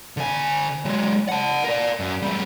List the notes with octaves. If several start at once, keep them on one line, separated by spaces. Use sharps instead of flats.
D3 G#5
F#3 G#3
F#5 A5
A#4 D5
F#2
G3 A3